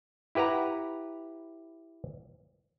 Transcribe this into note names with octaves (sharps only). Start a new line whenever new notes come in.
E4 G4 B4 F#5 A#5